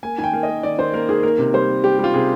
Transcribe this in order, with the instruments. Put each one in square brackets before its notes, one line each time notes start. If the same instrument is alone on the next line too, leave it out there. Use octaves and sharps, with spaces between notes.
[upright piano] A#3 G#5
D#3 G#5
G5
A#3
D#5
A#3
D#3 D5
D#3 C5
A#3 A#4
D#3 G#4
A#3 A#4
C3
G3 C5
A#3
G3 G4
G3
F4
C3 G#4